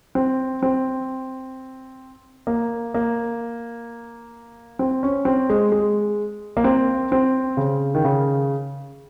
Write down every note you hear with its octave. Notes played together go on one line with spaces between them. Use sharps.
C4
C4
A#3
A#3
C4
C#4
C4
G#3
G#3
A#3
C4
C4
C#3
D#3
C#3